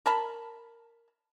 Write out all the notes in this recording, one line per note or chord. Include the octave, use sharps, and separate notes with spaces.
A#4 A5 B5